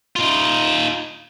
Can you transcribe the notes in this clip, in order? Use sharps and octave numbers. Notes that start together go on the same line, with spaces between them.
D#4 F4